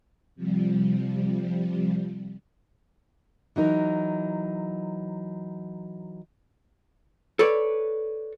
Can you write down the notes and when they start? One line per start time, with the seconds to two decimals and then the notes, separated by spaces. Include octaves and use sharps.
0.35 C3 F3 G3
3.56 E3 F#3 D#4 A#4
7.39 A4 B4 C#5 D5